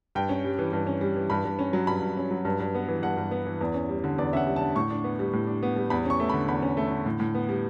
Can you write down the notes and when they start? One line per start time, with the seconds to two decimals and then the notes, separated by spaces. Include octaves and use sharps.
0.15 G2 G5
0.29 C#4
0.45 G3
0.59 E3
0.73 G2
0.87 C#4
1.01 G3
1.16 E3
1.30 G2 B5
1.45 G2
1.59 C#4
1.73 F#3
1.87 G2 B5
2.02 G2
2.17 C#4
2.31 F#3
2.45 G2
2.60 G2
2.75 B3
2.88 E3
3.03 G2 F#5
3.17 G2
3.31 B3
3.46 E3
3.61 E2
3.74 C#4
3.89 G3
4.04 D3
4.18 E2 D5
4.33 C#4 E5 F#5
4.47 G3
4.56 A5
4.61 D3
4.75 A2 C#6
4.90 D4
5.04 B3
5.19 G3
5.33 A2
5.47 D4
5.63 B3
5.76 G3
5.90 E2 B5
6.05 C#4 C#6
6.20 A3
6.29 B5
6.34 D3
6.48 E2 B5
6.62 C#4
6.77 A3
6.91 D3
7.06 A2
7.20 A2
7.35 B3
7.49 G3